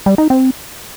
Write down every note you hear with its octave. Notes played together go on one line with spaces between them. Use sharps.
G3
D#4
C4